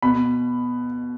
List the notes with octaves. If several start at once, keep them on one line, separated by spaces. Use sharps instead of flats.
B2 B5